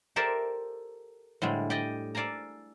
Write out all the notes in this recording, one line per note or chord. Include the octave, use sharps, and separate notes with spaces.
G4 A4 A#4 C5 D5 E5
A2 D3 G3 G#3
G4 D5 D#5 G5
A4 D5 F5 G#5 A#5